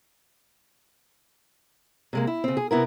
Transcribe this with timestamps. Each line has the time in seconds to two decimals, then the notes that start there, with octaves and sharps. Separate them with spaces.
2.13 C3 G#3 A#3
2.27 E4
2.44 C#3 C4
2.57 G#4
2.71 C3 B3 E4 A#4